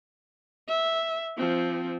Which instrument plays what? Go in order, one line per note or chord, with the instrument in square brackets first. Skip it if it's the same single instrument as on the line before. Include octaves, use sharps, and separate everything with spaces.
[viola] E5
F3 C4